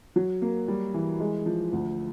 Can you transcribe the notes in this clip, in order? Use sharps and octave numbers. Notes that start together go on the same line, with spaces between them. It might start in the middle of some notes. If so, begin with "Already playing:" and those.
F#3
A#3
G3
E3
G#3
F3
D2